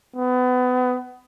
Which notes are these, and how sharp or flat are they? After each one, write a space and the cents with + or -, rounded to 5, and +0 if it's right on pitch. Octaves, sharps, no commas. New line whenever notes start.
B3 +30